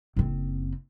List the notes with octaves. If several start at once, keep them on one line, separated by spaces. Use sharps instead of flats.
F#1 C4